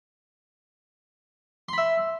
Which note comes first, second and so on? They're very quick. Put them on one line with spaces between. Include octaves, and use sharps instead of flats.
C6 B5 E5